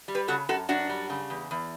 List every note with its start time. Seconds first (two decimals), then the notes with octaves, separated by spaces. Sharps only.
0.08 G3
0.15 G4 B4
0.28 C#3 F#4 A4
0.49 F#2 F#4 A4
0.69 F#2 D4 F#4
0.89 G3
1.10 C#3
1.30 E2
1.51 E2